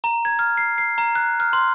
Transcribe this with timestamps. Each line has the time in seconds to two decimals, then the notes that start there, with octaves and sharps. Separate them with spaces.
0.04 A#5
0.25 G#6
0.39 F6
0.57 C7
0.78 C7
0.98 A#5
1.15 F#6
1.40 F6
1.53 C6